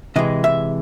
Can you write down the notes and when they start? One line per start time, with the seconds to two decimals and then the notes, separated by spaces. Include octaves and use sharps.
0.16 C3 E3 G#3 D#5
0.44 E5